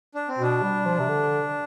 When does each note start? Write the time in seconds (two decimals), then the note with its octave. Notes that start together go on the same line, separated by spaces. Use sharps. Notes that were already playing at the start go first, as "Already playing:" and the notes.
0.15 D4
0.28 C4
0.38 B2 D4
0.62 G3
0.85 F3
0.99 C3
1.09 D3